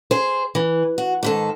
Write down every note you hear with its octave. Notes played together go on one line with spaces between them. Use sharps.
G#4 C5
E3
F#4
G#2 D#3 A4